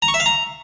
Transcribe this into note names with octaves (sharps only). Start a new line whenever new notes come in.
A#5
C#6
E5
F5
A#5